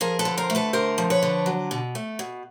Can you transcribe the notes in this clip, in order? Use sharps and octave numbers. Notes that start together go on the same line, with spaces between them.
F3 G#4 A#4
A4 B4
D3
A#4 C5
A3
A4 B4
D3 A#4 C5
F3
B4 C#5
D3
F#3
B2
A3
B2